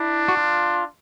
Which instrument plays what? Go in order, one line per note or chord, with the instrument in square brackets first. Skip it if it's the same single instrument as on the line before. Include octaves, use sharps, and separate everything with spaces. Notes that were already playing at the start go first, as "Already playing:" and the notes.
Already playing: [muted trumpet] D4 [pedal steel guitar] E4
[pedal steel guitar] F#4
F4